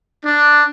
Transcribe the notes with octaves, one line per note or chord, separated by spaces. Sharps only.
D4